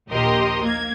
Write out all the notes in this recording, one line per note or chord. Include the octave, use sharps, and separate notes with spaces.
A#1 D#2 G4 A#4 D#5 C6
A#3 G#6